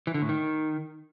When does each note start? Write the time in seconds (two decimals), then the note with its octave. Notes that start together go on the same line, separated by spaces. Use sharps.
0.07 E3
0.14 D3
0.22 A2
0.29 D#3